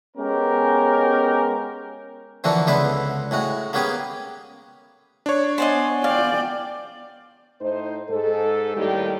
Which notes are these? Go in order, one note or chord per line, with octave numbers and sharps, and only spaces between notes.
G#3 B3 C#4 G4 A#4
D3 E3 F3 A#3 F#4 A4
C#2 D3 B3 E4 B4 C5
A2 G#3 F#4
A#3 B3 C#4 G4 G#4
D4 C#5
B3 C5 D5 D#5 F#5 G#5
D5 F5 G5
A2 D#4 C5
G#2 A4
D#2 A2 D#3 G3 G4